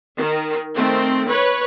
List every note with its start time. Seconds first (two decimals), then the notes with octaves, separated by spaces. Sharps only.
0.17 D#3
0.75 D#3 A3 C4
1.28 B4 C#5